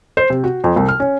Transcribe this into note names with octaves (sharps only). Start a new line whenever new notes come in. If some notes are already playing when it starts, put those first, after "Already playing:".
C5
C3
F#4
F2
C2
F6
C#4